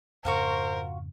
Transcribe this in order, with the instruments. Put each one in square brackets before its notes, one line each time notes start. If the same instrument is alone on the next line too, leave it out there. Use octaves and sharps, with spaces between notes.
[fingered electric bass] F2 G#2 C#3 [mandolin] F4 F#4 C#6 [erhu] A#4 [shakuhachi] C5